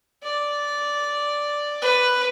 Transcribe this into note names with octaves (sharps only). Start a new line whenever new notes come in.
D5
B4